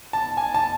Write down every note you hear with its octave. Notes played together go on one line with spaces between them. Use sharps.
A5
G#5
A5